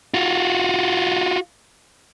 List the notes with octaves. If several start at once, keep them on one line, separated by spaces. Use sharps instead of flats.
F4 F#4